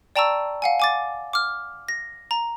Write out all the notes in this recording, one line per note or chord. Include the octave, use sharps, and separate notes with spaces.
D5 G5 A5 A#5 C#6 E6
F5 F#5 G#5
G#5 D6 A6
D6 F6
A#6
A#5